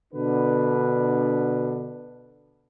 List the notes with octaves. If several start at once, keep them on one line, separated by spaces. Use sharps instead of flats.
B2 D3 D4 B4